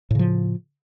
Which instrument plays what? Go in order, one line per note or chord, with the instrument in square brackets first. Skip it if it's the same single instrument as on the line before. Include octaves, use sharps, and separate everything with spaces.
[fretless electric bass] A2
C#3
F3